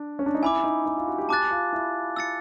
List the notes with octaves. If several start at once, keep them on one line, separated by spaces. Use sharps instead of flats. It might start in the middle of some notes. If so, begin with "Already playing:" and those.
Already playing: D4
C#4
D4
D#4
E4 G#5 B5 D6
D#4
E4
F4
F#4
G4
G4 A5 D6 F#6 A6
F4
E4
E6 A6 C#7